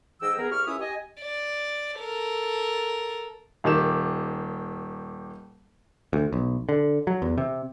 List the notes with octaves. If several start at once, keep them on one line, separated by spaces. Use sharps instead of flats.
G#2 E3 G#4 D#5 G5 E6
B3 G#4 A#4
C2 G4 C#6 F6
C#2 C#4 E4 C#5 E5 D#6
G4 D#5 G#5
D5
A4 A#4
D#1 D#3 G4 E7
D2
B1
D3
F#3
E2
C3